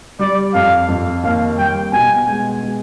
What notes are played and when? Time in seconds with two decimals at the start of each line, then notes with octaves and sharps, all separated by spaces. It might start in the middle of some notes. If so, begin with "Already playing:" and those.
0.19 G3 D5
0.54 F2 F5
0.88 F2
1.23 D#2 F5
1.58 G3 G5
1.92 B2 G#5
2.27 G#3
2.62 G#3